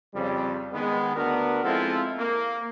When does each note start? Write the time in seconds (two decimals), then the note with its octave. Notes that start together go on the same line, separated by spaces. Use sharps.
0.15 F2 C#3 G3
0.73 D#3 G#3 B3
1.16 D2 B3 D4 F#4 A#4
1.64 F3 G#3 C4 E4 F4 A4
2.18 A#3